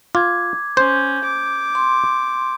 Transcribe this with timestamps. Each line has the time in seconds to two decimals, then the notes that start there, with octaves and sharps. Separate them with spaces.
0.15 F4 D6 G#6
0.77 C#4 C5 G6
1.24 D6
1.75 C6